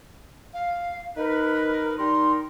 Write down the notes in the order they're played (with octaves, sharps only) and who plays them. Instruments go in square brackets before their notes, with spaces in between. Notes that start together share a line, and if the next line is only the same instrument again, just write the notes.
[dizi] F5
[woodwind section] D#4 B4 [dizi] A#4
[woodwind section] G3 D#4 A#4 [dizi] C6